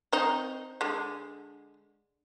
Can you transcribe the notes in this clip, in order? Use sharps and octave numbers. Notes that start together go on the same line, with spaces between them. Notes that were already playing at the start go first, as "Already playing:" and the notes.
C4 D#4
D3 G#3